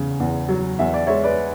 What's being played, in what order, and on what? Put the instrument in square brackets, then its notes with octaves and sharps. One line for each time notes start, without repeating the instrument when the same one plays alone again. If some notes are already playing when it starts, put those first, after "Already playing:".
Already playing: [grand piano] E2 C#3
E2
F#3
E2 E5
D5
G#3 C#5 E5
B4 D5